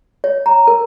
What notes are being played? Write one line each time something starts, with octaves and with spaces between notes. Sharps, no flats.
C#5
A#5
A#4